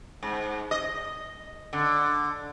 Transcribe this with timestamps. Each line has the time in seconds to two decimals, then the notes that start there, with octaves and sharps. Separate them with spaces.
0.23 G#2
0.71 D#5
1.73 D3